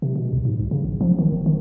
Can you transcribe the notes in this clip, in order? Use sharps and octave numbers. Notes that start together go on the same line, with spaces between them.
C3
B2
C2
G#2
C2
C#3
A#1
F3
D#3
F1
D#3